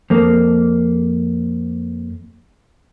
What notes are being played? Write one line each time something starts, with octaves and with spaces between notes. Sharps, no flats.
F2 A#3